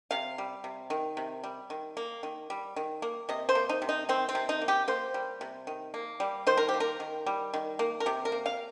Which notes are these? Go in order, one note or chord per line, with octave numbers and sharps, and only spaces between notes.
C3 F5
G3
C3
D#3
C3
G3
D#3
A#3
D#3
G3
D#3
A#3
C3 D#5
C5
A#3
D#4
C3
D#4
D#3 C4
C4
C3
D#4
A#3
G4
A#3 C5
G3
C3
D#3
A#3
G3
D#3 C5
A#4
G4
A#3
A#4
D#3
G3
D#3
A#3
A#4
C3 G4
A#4
A#3
F5